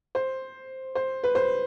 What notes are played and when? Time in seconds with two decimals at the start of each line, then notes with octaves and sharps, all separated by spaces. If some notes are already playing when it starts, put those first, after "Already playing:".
0.15 C5
0.95 C5
1.24 B4
1.35 C5